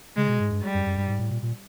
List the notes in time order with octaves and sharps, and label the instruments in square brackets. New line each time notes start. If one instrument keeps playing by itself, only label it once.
[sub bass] C#3 [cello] G#3
[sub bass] B2
G#2
G2
[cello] G3
[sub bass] F#2
F#2
G2
G#2
A2
A#2
A#2